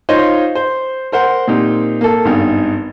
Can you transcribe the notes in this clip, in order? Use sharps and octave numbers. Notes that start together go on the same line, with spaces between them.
D#4 F4 C5 C#5 D#5 F5
C5
A#4 C5 F#5
A#2 C4 D#4 G4
A#3 A4
G#1 G2 B3 D#4